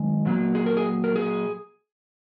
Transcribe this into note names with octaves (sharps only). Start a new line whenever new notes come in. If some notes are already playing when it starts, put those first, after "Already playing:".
Already playing: F#2 D#3 G#3
A#2 F#3 A#3
G#4
A#4
G#4
A#4
G#4